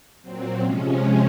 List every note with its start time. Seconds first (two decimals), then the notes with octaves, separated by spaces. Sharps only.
0.22 A#2 F#3 C4
0.61 C3 F3 G#3 C#4